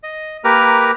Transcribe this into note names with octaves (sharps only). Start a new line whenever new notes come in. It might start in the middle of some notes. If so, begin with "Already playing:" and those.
D#5
A#3 G4 A#4 B4 A#5